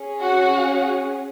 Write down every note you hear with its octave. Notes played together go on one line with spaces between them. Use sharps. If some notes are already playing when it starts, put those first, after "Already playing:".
Already playing: C#4 G#4
F#4 F#5